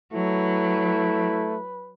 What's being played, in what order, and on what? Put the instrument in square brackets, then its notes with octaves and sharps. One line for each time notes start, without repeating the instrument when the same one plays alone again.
[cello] F#3 [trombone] A3 [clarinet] E4 [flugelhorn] B4